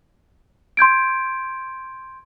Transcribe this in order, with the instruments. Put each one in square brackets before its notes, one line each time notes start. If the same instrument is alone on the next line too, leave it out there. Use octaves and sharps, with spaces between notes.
[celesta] C6 G6 G#6 D7